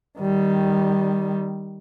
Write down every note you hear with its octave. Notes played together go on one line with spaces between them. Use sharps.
D#3 G3